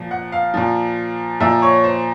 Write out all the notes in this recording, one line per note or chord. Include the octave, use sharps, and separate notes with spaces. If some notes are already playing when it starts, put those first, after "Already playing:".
Already playing: A#2 F3
F#5
F5
A#2 F3
A#2 F3 E5
C#5
C5